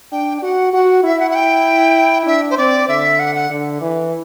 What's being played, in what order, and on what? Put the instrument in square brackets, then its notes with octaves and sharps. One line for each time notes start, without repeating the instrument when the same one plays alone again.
[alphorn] D4 [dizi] G5
[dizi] G5
[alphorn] F#4 [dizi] F#5
[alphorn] F#4 [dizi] F#5
[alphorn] E4 [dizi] E5
[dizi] F#5
F#5
G5
[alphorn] D4 [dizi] E5
[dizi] C5
[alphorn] C4 [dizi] D5
[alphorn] D3 [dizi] E5
[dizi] F#5
F#5
[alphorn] D3
E3